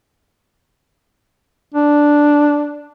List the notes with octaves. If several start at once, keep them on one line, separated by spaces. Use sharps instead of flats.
D4